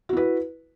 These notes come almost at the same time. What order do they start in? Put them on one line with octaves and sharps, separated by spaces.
F#4 E4 B4